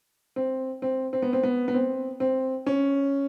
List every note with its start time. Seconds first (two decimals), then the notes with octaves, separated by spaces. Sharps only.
0.36 C4
0.82 C4
1.13 C4
1.22 B3
1.33 C4
1.43 B3
1.68 B3
1.74 C4
2.20 C4
2.67 C#4